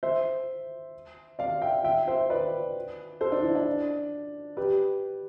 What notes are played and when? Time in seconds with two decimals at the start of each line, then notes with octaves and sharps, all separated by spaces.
0.03 C5 E5
1.39 D5 F5
1.62 E5 G5
1.84 E5 G5
2.07 C5 E5
2.30 B4 D5
3.21 A4 C5
3.32 D4
3.43 E4
3.55 D4
4.57 G4 B4